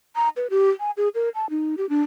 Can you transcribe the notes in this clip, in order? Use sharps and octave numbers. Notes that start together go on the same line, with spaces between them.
A#5
B4
G4
G#5
G#4
A#4
A5
D#4
G4
D4